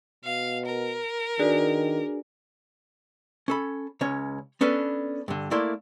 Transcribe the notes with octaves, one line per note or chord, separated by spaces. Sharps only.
B2 F5
A#4
D#3 D4 F#4 G#4 B4 D5
C#4 A4 B5
C#2 C#4 C#5
B3 C#4 D4 A4 B4
G2 D3
A3 A#3 E4 D5 C6